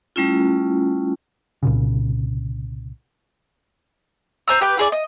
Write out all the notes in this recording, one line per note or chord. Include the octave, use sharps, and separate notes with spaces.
G3 A3 C#4 E4 F4
C2 A#2 C#3
C5 G#5 A#5 E6
G4 B4 G5
E4 G#4 D5
D#5